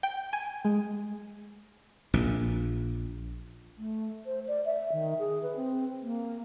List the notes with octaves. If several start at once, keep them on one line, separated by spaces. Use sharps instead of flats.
G5
G#5
G#3
A#1 A#2
A3
C5
D5
E5
D#3
G#4
B4
C4
A#3